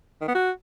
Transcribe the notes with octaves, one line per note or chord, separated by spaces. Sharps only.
D#3
B3
F#4